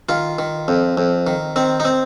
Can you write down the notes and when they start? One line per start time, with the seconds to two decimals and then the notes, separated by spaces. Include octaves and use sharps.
0.09 D#3 F4
0.39 D#3
0.68 F2
0.97 F2
1.27 D#3
1.56 D#3 C4
1.80 D#4
1.85 C4